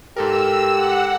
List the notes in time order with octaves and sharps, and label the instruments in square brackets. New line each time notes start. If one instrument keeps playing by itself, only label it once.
[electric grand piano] G#2 A4 A#4 [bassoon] G4 [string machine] E6
[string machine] F#5